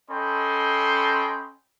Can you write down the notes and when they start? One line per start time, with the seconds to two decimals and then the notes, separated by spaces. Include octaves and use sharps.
0.10 C#4 A4 D#5 G5 B5 C6